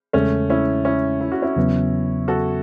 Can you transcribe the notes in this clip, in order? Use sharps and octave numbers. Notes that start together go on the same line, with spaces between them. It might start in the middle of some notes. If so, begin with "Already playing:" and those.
E2 C#3 G#3 A3 C#4
C#4 E4
C#4 E4
E4
F#4
C#4 E4
E2 C#3 F#3 B3
F#4 A4